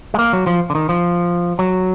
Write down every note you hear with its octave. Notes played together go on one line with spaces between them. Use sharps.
G#3
A#3
F#3
F3
D3
D#3
F3
F#3